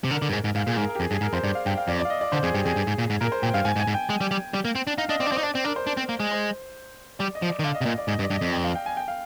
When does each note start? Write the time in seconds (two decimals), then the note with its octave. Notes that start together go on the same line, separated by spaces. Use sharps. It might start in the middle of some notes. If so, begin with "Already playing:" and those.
0.04 C3
0.10 D3 A#4
0.22 D3
0.29 G2
0.33 G#2
0.44 G#2
0.55 G#2 F5
0.67 A#2 G#4
0.77 G#2 A#4
0.89 A#4
0.95 G4
1.00 F2 G#4
1.11 G2 G#4
1.21 G#2 A#4
1.33 F2 C5
1.43 G2 D5
1.55 F5
1.66 G2 G5
1.77 F5
1.88 F2 D5
2.00 D5
2.05 F5
2.10 D#5
2.21 D5
2.32 D3 C5
2.43 F2 G#4
2.54 G2 G4
2.65 F2 G#4
2.76 G2
2.87 G#2
2.99 A#2
3.10 G#2
3.21 A#2 A#4
3.32 C5
3.43 A#2 G5
3.54 G2 F5
3.65 G#2 G#5
3.76 G#2
3.79 G#5
3.88 G#2
3.94 G5
4.10 G#3
4.21 G3
4.31 G3
4.54 G3
4.65 A#3
4.75 C4
4.87 D4
4.98 D#4 F5
5.09 D4 D#5
5.20 C4 D5
5.26 D4
5.32 C4 C5
5.38 D#4
5.43 D4 D5
5.54 C4 D5
5.64 D4 A#4
5.76 C5
5.87 D4
5.97 C4
6.09 A#3
6.20 G#3
6.31 C5
7.19 G3 D5
7.35 D#5
7.42 F3
7.50 D5
7.59 D#3
7.64 D3 F5
7.75 D#5
7.81 C3
7.86 A#2 D#5
7.98 D5
8.08 G#2 D#5
8.19 G2
8.24 D5
8.30 G2
8.37 F2 D#5
8.53 G5
8.64 F5
8.75 G5
8.86 G#5
8.97 G5
9.08 F5